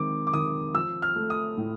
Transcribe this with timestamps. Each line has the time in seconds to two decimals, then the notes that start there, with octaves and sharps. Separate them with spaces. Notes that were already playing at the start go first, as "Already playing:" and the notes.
Already playing: D#3 G#3 C4 D6
0.27 D6
0.33 D#3 D#6
0.74 F3 E6
1.02 F6
1.16 A3
1.30 D#6
1.57 A2